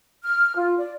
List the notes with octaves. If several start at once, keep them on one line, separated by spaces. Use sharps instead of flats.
F6
F4
D5